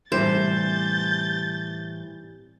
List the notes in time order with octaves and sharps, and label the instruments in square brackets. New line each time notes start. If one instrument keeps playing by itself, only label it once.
[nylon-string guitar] A2 E3 E4 [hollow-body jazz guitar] C3 G3 [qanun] C5 [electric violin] G6 A6